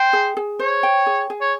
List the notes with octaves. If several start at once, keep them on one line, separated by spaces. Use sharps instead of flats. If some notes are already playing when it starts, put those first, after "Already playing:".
Already playing: C5 G5
G#4
G#4
C5 C#5
G5
G#4
G#4
C#5